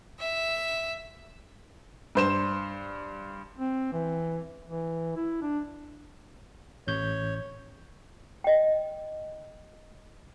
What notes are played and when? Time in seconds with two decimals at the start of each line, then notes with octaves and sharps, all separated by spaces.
0.19 E5
2.15 G2 C5 E7
3.58 C4
3.92 E3
4.67 E3
5.16 E4
5.42 D4
6.87 A1 C#5 G6
8.44 D#5 G5